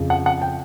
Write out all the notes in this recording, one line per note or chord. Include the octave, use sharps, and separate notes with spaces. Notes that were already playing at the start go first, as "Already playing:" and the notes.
Already playing: F2 C#3 F3
F#5
F#5
G5